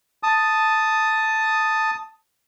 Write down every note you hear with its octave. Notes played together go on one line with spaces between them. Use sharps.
A5 D#6